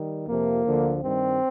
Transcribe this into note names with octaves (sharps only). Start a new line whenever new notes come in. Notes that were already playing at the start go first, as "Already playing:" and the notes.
Already playing: D#3 G3
F2 C3 F3 A#3
D2 D3 F3
G2 D#3 G3 C4